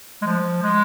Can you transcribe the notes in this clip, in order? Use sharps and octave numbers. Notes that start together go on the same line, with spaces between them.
G#3
F3
G#3